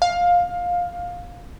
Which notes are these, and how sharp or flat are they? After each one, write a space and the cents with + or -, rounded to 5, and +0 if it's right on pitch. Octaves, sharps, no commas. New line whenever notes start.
F5 +15